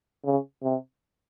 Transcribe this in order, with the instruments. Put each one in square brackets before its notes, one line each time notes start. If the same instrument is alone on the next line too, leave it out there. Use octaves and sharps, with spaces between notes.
[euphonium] C#3
C3